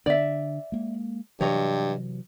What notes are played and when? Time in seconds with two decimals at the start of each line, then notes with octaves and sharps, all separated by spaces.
0.06 D3 D4 D5 E5
0.72 G#3 A#3
1.41 G2 C3 E3 F#3 C#5 D#5